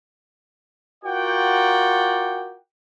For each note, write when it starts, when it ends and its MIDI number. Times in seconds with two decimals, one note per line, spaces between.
1.04 2.57 65
1.04 2.57 66
1.04 2.57 70
1.04 2.57 74
1.04 2.57 78
1.04 2.57 79